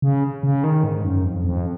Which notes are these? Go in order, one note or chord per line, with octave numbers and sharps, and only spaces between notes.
C#3
C#3
D#3
G#2
F#2
F2
F2